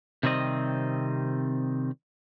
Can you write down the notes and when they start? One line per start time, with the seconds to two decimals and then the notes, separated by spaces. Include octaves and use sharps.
0.23 C3 D#3 G3 C4 D#5